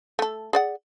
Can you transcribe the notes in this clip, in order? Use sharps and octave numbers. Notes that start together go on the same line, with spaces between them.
A3 A4
G#4 D5 F#5